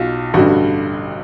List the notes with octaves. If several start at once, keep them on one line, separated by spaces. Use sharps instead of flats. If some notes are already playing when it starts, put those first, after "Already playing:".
Already playing: B1 B2 F4
A1 G2 D3 F#4